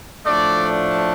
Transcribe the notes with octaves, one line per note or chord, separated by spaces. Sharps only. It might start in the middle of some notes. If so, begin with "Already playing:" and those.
A2 F3 A3 D4 D5